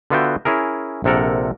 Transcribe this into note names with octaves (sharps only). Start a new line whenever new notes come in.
D3 B3 F4 F#4 E5 G5
C#4 E4 G#4 A#4
A#1 C3 A4 A#4 F#5